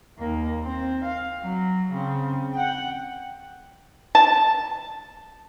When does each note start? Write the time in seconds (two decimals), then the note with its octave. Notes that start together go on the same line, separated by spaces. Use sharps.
0.19 D#2 A#3
0.63 C4
1.05 F5
1.42 F#3
1.91 C#3 C4
2.54 F#5 G5
4.15 A5